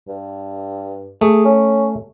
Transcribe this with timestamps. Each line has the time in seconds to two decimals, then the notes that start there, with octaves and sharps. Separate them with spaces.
0.08 G2
1.21 A3 G#4
1.45 C#4